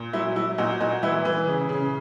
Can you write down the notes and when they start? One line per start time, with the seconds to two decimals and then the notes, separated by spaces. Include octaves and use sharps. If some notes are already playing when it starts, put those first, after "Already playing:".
Already playing: A#2
0.13 F#3 E4
0.36 F#3 E4
0.58 A#2 D#4 F#4
0.80 A#2 D#4 F#4
1.03 E3 E4
1.25 E3
1.48 C#3
1.69 C#3